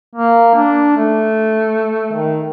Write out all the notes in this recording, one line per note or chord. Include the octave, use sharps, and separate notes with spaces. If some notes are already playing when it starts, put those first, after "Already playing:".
A#3
D4
A3
D#3